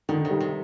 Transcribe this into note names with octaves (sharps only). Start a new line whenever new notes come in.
D3 D#3
C3
G3
C3